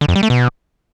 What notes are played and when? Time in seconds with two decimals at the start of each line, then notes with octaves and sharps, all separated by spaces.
0.01 D3
0.08 F2
0.16 G3
0.23 A3
0.30 B2